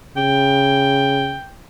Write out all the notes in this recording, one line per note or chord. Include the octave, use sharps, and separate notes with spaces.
C#3 G5